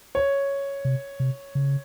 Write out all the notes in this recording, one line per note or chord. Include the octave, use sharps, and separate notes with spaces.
C#5
C3
C3
C#3